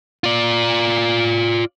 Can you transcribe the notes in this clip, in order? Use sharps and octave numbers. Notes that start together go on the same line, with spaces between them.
F4 D5